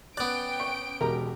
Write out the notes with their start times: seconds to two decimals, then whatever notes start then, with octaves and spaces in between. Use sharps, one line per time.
0.17 B3 C#4 D5 G5 F#6 D7
0.60 C#6
1.01 E1 B2 G4 A#4 A#5